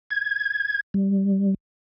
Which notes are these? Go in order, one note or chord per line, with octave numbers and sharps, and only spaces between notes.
G#6
G3